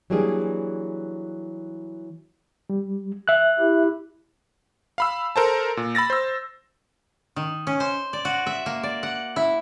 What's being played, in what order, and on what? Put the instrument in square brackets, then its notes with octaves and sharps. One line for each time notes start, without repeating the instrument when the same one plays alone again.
[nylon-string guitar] E3 F#3 G3 A#3 D4 G#4
[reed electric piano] G3
E5 F#6
[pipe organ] E4 G4
[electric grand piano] F5 B5 E6
A4 A#4 C5 A5
A#2
B5 E6 A6 A#6
C5 E6
[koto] D#3
C#4
C5
D5
F#4
E5
A#3
D5
F#5
E4